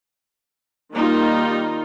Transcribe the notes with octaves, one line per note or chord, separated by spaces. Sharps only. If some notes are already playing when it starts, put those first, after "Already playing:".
D#3 G3 A#3 D#4 F4